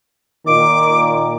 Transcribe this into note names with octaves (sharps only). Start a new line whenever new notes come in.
A#2 D#3 D6